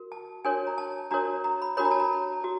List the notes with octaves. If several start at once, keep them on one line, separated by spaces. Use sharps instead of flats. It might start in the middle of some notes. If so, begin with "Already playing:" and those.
Already playing: F#4 A#4
A5
D4 F#4 A#4 C#5 G#5
A#5
A5
D4 F#4 A#4 C#5 A#5
A#5
B5
D4 F#4 A#4 C#5 B5
A#5
A5
A#5
F#4